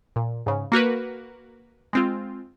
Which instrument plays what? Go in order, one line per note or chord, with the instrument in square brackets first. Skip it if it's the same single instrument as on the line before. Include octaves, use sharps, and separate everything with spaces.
[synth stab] A#2
G#2 C#3
A#3 F#4 A#4 B4
G#3 C4 F4